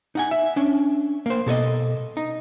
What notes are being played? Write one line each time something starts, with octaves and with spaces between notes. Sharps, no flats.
D#4 F#5 G#5
E5
C#4 D4
A#3 C5
B2 A4 C#5 D#5
D#4